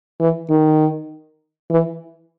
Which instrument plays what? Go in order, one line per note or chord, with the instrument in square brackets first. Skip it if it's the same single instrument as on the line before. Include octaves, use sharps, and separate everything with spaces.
[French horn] E3
D#3
E3